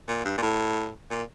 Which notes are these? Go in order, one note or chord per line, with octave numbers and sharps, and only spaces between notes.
A#2
G2
A#2
A2
A#2